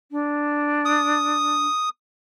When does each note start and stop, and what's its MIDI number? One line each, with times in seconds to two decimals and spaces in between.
0.11 1.65 62
0.85 1.89 87